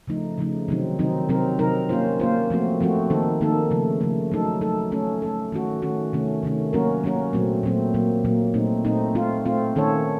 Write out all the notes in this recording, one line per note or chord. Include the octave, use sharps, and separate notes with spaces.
C#3 F3 A3 D#4
C#3 F3 A3 D#4
C3 D#3 F#3 C4 D#4
C3 D#3 F#3 C4 D#4
C3 F#3 C4 D#4 A#4
C3 F#3 C4 D#4 A#4
A#3 C#4 F4 C5
A#3 C#4 F4 C5
F3 A3 C4 F#4
F3 A3 C4 F#4
D#3 A#3 D#4 A4
D#3 A#3 D#4 A4
C#3 F3 A3
C#3 F3 A3
F#3 A3 D#4 A4
F#3 A3 D#4 A4
A3 C#4 A4
A3 C#4 A4
D#3 A3 C#4 F#4
D#3 A3 C#4 F#4
C3 D#3 A3 C#4
C3 D#3 A3 C#4
F#3 A#3 C#4 F#4 A#4
F#3 A#3 C#4 F#4 A#4
A#2 F#3 A3 C4
A#2 F#3 A3 C4
A#2 F#3 A#3
A#2 F#3 A#3
A#2 A3 C4 D#4
A#2 A3 C4 D#4
A3 C4 F4
A3 C4 F4
D#3 A3 C#4 A4 C#5